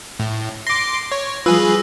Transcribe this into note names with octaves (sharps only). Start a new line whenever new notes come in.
A2
C6 D6 A#6
C#5
F3 G3 F4 G#4 B4 E6